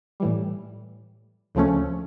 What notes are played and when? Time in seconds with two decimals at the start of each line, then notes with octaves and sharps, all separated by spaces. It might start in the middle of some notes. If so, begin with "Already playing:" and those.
0.20 A2 E3 G3
1.55 D2 C#3 F3 A3 C#4